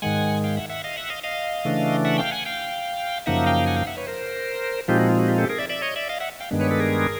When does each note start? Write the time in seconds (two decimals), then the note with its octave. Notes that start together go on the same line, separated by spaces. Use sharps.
0.02 G#2 D#3 G#3 F#5 G#5
0.44 F5 G5
0.57 E5 F#5
0.70 E5 F#5
0.84 D#5 F5
0.97 E5 F#5
1.10 D#5 F5
1.24 D#5 F5
1.65 C#3 E3 A3 D4
2.05 E5 F#5
2.18 F5 G5
2.31 F#5 G#5
2.45 F5 G5
3.26 F#2 C#3 F3 A#3 D#4 E5 F#5
3.46 F5 G5
3.66 F#5 G#5
3.76 F5 G5
3.87 E5 F#5
3.97 B4 C#5
4.07 A#4 C5
4.88 A#2 F3 G#3 C4 D#4 F4 G4
4.99 F#4
5.09 F4
5.19 F#4
5.28 F4 G4
5.38 G4 A4
5.49 G#4 A#4
5.59 D5 E5
5.69 D5 E5
5.82 C#5 D#5
5.96 D5 E5
6.09 D#5 F5
6.20 E5 F#5
6.40 F5 G5
6.51 G2 D#3 G#3 B3 D4
6.60 B4 C#5
6.71 A4 B4
6.80 G#4 A#4